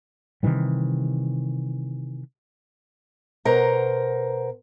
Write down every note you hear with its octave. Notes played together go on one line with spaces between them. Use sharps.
C3 D#3 E3 G3
B2 A#4 C5 F#5 A#5